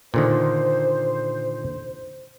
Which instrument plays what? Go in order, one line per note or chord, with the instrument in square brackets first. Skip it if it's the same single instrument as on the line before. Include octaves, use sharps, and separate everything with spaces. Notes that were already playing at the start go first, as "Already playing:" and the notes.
[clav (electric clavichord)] A#2 D3 D#3 [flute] C5